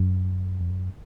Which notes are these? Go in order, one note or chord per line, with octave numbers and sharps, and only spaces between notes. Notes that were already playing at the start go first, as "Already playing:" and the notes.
Already playing: F#2
F2
F#2